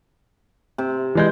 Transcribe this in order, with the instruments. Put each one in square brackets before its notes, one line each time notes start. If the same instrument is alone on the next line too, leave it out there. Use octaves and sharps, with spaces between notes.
[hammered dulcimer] C3
[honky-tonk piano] E3 G#3 G6